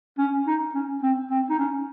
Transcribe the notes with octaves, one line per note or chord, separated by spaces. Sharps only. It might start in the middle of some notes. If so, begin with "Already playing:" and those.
C#4
D#4
C#4
C4
C4
D#4
C#4